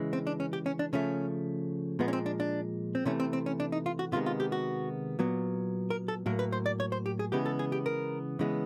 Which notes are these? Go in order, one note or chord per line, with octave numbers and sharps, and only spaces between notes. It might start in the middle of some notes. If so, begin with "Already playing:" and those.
Already playing: C#3 E3 G#3
C4
D4
C#4
G4
C#4
D4
C#3 F3 A3 C#4
A#2 F3 G#3 B3
C#4
C4
D4
D4
C4
C3 E3 A3 C#4
C4
C4
C#4
D4
D#4
F4
F#4
C3 D#3 G#3 B3 F4
F4
G4
F#4
A#2 F#3 B3
A#4
A4
A2 F#3 A#3 A#4
B4
C5
D5
C#5
C5
G4
G#4
C#3 E3 G#3 B3 G4
A4
G#4
G4
A#4
C#3 E3 G#3 B3